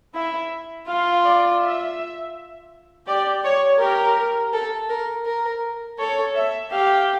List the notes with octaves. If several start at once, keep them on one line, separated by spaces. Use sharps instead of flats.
E4 E5
F4 F5
D5
E5
G4 D5
C#5
G4 A#4
A4
A#4
A#4
A4 C#5
E5
G4 F5